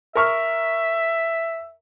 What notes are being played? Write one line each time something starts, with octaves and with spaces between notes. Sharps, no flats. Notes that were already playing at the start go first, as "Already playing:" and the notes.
A#4 E5 C#6 F6